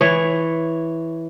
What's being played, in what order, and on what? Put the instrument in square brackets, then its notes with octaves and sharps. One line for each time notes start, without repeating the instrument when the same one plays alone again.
[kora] E3 C#5